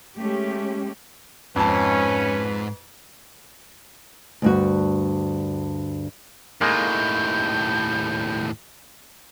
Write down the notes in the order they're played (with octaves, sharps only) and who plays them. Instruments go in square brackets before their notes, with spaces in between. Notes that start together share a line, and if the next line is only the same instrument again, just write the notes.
[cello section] G#3 A3 C#4 G4
[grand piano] F2 A5 [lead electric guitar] G#2 [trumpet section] C#4 [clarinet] B4
[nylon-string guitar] D2 G2 F#4
[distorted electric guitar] D#2 A2 [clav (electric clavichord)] G#3 A#3 [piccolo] G6